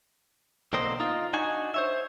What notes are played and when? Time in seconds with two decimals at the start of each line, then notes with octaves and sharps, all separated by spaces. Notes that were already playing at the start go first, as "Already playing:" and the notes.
0.73 B1 D3 A#3 C4 C5 D#5
1.00 D#4 F4
1.33 D4 D#4 F#4 G#5
1.74 C5 C#5 E5